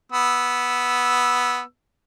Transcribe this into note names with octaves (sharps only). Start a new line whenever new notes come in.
B3 E6